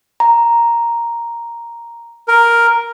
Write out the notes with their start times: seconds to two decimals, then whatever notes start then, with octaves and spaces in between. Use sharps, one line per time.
0.20 A#5
2.28 A#4